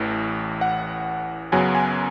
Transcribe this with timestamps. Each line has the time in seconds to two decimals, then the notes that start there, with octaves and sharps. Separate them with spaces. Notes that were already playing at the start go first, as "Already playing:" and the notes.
Already playing: A1 A2 E3
0.61 F#5
1.52 F#2 C#3 F#3 B3 G#5
1.75 G#5